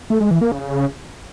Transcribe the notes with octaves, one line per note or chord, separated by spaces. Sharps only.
A3
G#3
E3
A#3
C#3